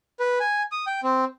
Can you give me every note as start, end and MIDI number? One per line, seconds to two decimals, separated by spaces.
0.20 0.39 71
0.40 0.63 80
0.72 0.85 87
0.87 1.00 79
1.03 1.25 60